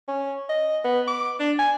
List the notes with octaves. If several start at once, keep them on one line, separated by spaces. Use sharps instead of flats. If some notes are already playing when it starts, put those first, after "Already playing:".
C#4
D#5
B3
D6
D4
G#5